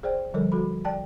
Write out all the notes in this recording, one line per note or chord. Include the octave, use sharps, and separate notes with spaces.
G#4 C5 D5 G5
D3 F3 G3 A4 A#4 C#5
F#4 A4 B5
D5 G5 A5